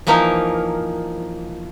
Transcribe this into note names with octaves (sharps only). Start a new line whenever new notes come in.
E3 F3 A#3 D#4 A#4